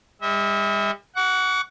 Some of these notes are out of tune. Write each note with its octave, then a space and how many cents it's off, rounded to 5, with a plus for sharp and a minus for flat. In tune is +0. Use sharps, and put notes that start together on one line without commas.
G3 +45 E5 -35
F#5 +0 C#6 +45